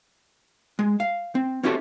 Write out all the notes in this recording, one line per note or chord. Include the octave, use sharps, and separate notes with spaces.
G#3
F5
C4
C4 C#4 E4 F#4 G4 A4